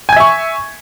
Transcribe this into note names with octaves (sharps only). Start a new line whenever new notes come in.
E5 G#5 C#6 G#6